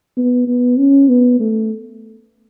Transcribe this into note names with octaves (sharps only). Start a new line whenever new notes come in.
B3
B3
C#4
B3
A3